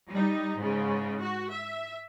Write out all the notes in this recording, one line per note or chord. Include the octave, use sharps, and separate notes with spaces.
G3 D#4
G#2 C#3
F#4
E5